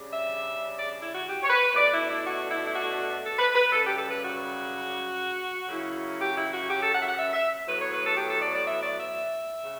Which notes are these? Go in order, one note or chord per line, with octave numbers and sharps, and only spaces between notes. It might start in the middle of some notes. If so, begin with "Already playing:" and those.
Already playing: C#3 G3 D4
E5
D5
E4
F#4
G4
C#5
B4
B2 A3 D4 D5
E4
E4
F#4
E4
E4
F#4
A4
B4
B4
F#2 C#3 G3 A4
G4
A4
B4
F#4
F#2 C#3 F#3 C#4 E4
G4
E4
F#4
G4
A4
F#5
E5
F#5
E5
E5
A2 F#3 B3 B4
C#5
B4
A4
G4
A4
D5
D5
E5
D5
E5
C#3